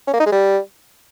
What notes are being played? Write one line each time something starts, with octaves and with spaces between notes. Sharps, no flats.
C#4
A#3
D#4
G#3
G3